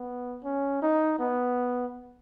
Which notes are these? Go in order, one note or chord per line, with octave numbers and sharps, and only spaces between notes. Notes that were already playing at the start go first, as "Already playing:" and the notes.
Already playing: B3
C#4
D#4
B3